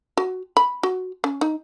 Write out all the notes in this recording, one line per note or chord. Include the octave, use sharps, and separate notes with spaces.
F#4
B5
F#4
C#4
D#4